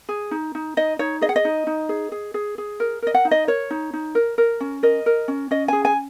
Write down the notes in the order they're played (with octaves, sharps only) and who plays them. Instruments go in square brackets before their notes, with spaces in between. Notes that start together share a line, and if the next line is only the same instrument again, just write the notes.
[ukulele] G#4
D#4
D#4
D#4 D#5
D#4 C#5
G#4 D#5
F#5
D#5
D#4
D#4
G#4
G#4
G#4
G#4
A#4
A#4 D#5
F#5
D#4
D#5
A#4 C#5
D#4
D#4
A#4
A#4
C#4
A#4 D#5
A#4
C#4
C#4 D#5
G#4 G#5
G#5